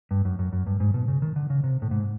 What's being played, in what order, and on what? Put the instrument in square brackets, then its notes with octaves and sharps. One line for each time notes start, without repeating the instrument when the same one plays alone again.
[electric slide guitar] G2
F#2
F#2
F#2
G2
G#2
B2
C#3
D#3
D3
C#3
C3
A2
G#2